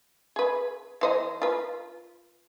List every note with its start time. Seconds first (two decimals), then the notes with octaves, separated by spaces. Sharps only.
0.36 G#4 B4
1.01 E3 C5 D#5
1.42 F4 B4